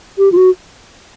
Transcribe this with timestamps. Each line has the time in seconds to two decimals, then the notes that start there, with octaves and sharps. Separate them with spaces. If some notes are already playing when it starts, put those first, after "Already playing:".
0.18 G4
0.32 F4
0.37 F#4